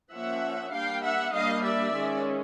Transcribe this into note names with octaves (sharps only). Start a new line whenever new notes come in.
F3 A#3 C#4 E5 F#5
G3 A#3 D4 F5 G5
E5 F#5
G3 A#3 D4 D#5 F5
D5 E5
D#3 G#3 C#4